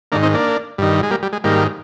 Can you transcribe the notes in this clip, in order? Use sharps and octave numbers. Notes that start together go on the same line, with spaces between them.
G#2 D#3 A#3 D4
C4 D#4
A#3 D4
G2 D#3
G#3
G3 A#3
G3
G#3
G#2 D#3 G3 A#3